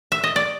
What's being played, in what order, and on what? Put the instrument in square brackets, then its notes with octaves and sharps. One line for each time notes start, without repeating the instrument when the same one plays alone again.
[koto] E5
D#5
D5